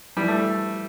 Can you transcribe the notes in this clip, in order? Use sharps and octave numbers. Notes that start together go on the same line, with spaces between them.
E3 G3
A3